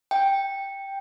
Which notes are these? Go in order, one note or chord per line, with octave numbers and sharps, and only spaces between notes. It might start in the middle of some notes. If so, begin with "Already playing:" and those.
G5